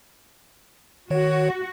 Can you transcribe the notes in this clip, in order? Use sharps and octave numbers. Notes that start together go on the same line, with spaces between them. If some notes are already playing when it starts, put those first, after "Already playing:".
D#3 F#4 C#5